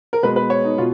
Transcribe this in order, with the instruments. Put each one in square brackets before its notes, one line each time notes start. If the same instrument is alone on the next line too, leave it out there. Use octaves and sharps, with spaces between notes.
[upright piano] A#4
B2 G#3 B4
B4
C#5
D#4
B2 F4